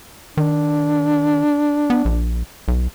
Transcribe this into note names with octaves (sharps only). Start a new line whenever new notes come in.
D#3 D4
B3
A#1
B1